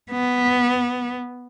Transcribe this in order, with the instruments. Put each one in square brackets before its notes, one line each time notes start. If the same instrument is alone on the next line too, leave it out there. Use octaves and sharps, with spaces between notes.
[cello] B3